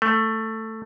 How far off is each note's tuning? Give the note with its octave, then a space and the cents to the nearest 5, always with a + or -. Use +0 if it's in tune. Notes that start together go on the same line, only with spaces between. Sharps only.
A3 +10